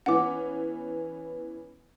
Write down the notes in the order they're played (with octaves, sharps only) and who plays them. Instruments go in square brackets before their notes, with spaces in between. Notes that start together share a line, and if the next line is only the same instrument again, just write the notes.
[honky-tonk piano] E3 B3 C#4 [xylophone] F#5 D6